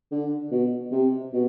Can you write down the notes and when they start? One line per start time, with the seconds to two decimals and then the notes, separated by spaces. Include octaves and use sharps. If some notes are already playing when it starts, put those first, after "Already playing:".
0.11 D3
0.51 B2
0.92 C3
1.33 B2